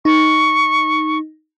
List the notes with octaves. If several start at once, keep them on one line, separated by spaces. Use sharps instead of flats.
D#4 C#6